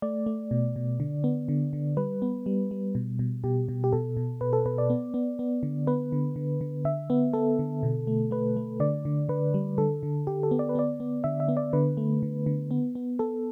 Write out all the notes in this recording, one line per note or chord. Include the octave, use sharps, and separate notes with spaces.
A3 D5
A3
B2
B2
D3
B3
D3
D3
G3 B4
B3
G3
G3
B2
B2
B2 G4
B2
G4
B2 A4
B2
B2 B4
A4
B2 B4
D5
B3
B3
B3
D3
B3 B4
D3
D3
D3
D3 E5
B3
B3 A4
D3
B2
A3
A3 B4
A3
D3 D5
D3
D3 B4
G3
D3 A4
D3
D3 G4
A4
B3
D5
B4
B3 D5
B3
D3 E5
E5
B3
D5
D3 B4
A3
D3
D3
B3
B3
B3 A4